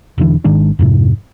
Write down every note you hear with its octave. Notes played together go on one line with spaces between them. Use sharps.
E1 D3 E3
G#1 D#3 G#3 D4
F2 G#2 C3